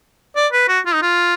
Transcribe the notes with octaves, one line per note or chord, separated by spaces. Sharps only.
D5
B4
F#4
F4
D#4
F4